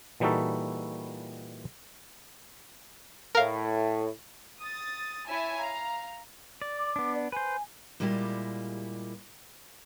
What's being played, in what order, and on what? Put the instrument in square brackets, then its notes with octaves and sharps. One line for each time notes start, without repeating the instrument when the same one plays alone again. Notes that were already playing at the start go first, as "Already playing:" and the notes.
[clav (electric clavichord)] A#2 E3 G3 D#4 F#4 A4
[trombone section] A2 [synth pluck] A#4 F5
[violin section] D#6 A6
E4 C#5 E5 G#5 A5
F5 A#5
[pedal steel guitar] D5
[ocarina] D6
[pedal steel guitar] B3 D4
[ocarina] D5
[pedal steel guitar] B4 C5 [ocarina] G#5
[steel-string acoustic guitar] A#2 G3 G#3 A#3 E4 G4